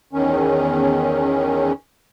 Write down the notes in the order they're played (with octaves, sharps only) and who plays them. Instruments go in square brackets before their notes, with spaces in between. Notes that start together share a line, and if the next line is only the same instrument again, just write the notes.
[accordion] E2 D#3 C#4